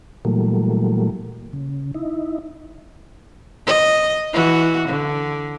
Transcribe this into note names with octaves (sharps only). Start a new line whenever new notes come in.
A#2 E3 F#3 G3 A3 A#3
C#3
D#4 E4
D#5
E3 F#4
D3